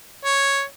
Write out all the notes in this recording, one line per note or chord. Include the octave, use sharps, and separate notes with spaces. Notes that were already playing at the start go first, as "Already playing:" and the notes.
C#5